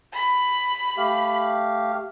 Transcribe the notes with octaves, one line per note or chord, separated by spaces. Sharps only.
B5
A3 G4 F5